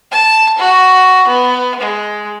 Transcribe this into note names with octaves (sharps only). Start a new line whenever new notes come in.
A5
F#4
B3
G#3